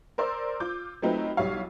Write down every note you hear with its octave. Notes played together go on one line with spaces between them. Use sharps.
A#4 C5 D5 C6 E6
F4 D6 G6
F#3 A3 C4 D#4 F4 B4
B1 G3 E4 C#5 F5